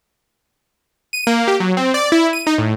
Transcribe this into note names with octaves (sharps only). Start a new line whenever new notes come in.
D#7
A#3
G4
F#3
C4
D5
E4
D#7
D#4
A2